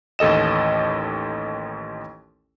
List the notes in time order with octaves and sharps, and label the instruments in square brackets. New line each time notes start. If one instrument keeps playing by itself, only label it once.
[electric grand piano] A1 D#2 A4 D#5 E7